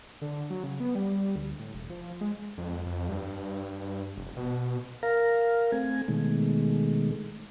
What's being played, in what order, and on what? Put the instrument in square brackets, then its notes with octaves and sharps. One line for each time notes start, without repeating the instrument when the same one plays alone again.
[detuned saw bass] D3
F#3
C#3
B3
G3
D2
A2
E1
F3
G#3
F2
F2
G2
F1
B2
[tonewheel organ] A#4 F5 A#5
A3 C4 G#5
B2 D#3 G#3 A3